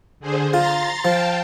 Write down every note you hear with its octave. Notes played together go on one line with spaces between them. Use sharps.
D3 G#4 C5
F4 A#5 C6 A6
F3 F5 G5 A5